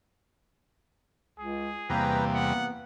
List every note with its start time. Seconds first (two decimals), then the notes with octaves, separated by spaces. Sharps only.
1.39 C#2 G#4
1.90 E2 C3 G3 A#3 B4 G5 A#5
2.34 B3 F#5